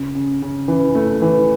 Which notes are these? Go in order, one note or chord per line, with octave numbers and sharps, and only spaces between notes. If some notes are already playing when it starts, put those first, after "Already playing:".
Already playing: C#3
C#3
C#3
E3
A3
E3